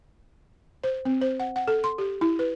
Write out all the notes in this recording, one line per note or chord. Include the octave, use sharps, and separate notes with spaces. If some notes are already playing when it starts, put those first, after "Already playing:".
C5
C4
C5
F#5
F#5
A4
C6
G4
E4
B4